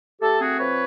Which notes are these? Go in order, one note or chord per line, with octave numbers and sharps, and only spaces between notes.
A3 G4 A4
C4 F#4 G#4
F3 B4 C#5